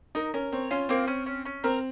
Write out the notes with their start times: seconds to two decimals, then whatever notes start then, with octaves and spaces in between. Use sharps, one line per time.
0.15 D#4 A#4
0.34 C#4 A#4
0.52 C4 C#5
0.71 C#4 F4
0.89 A#3 C4
1.07 C#4
1.26 C#4
1.45 C#4
1.64 C4 A#4